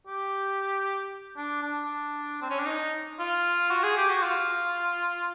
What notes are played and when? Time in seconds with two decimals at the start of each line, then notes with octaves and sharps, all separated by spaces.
0.07 G4
1.37 D4
1.63 D4
2.42 C4
2.50 C#4
2.59 D4
2.66 D#4
3.19 F4
3.71 F#4
3.84 G#4
3.97 G4
4.10 F#4
4.23 F4